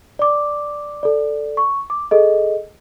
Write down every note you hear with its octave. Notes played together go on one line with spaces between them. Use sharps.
D5 D6
A4 D5
C#6
D6
G#4 A4 D#5